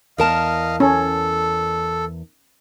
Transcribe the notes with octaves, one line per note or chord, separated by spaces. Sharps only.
E2 A#4 D#5 F5 A5
C#4 A4